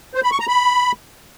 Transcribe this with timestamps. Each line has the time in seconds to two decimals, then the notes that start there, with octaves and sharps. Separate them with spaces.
0.15 C5
0.23 B5
0.31 C#6
0.40 A#5
0.48 B5